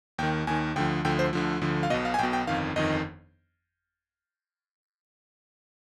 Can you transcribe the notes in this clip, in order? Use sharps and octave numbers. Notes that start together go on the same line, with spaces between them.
D#2 D#3 G5
D#2 D#3 G#5
D2 D3 F3 G5
D2 D3 F3 G5
C5
D2 D3 F3
D2 D3 F3
F5
B1 B2 D#5
F5
G#5
B1 B2 G5
G5
G1 F2 D#3 F5
G1 F2 D#3 D#5